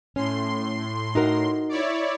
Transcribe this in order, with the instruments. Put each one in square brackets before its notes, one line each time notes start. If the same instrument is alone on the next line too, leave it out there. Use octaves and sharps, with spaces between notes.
[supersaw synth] A2 C6 [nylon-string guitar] C#4
[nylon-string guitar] D#4 F#4 A#4
[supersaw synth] E4 C#5 D5